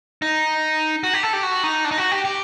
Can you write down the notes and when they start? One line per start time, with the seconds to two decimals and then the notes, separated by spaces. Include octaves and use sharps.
0.22 D#4
1.03 F#4
1.14 G4
1.23 A4
1.33 G4
1.43 F#4
1.63 D#4
1.85 D4
1.91 D#4
1.98 F#4
2.11 G4
2.25 G4